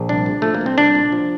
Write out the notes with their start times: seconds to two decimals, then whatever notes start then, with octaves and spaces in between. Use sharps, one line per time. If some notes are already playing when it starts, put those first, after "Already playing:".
Already playing: A#1
0.09 C2 D4
0.26 A#2
0.42 F3 A3
0.55 A#3
0.61 C2 C4
0.78 C2 D4
0.95 A#2
1.12 F3